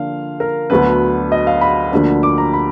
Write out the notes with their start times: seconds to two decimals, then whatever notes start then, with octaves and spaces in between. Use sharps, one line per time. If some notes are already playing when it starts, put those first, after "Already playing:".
Already playing: D3 F3 A#3 D4 F4 F5
0.40 A#4
0.70 D2 D3 F#3 B3 D4 B4
1.32 D#5
1.47 F5
1.61 B5
1.92 D2 D3 F3 A#3 D4
2.23 D6
2.38 A#5
2.53 B5